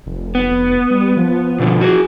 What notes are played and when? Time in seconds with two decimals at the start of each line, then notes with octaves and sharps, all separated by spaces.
0.06 F1
0.35 B3
0.91 G3
1.17 F3
1.59 B2 D3
1.81 F#4 G#4